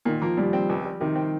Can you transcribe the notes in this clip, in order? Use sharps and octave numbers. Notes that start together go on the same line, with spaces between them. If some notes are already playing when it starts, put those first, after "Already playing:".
A#2 D#3
F3 A#3
A#2 G3
C4
C#2
G3
C3 D#3
C4